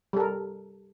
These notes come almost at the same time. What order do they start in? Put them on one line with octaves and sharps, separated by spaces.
G3 A4 A#4